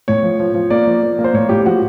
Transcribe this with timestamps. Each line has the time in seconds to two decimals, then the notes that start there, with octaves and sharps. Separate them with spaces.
0.08 A2 C#5
0.23 F3
0.39 F3
0.54 F3
0.70 A#3 D5
0.87 F3
1.03 A#3
1.19 A#3
1.24 C5
1.33 A2 C#5
1.49 A2 G4
1.65 F3 F#4